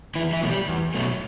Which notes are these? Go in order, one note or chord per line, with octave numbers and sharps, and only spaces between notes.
E2 E3 E4
E3 E4
B2 F#3 A3
G3 G4
E2
B2 F#3 A3